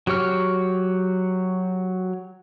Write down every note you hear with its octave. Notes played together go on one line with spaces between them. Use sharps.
F#3 G4 C#5 F6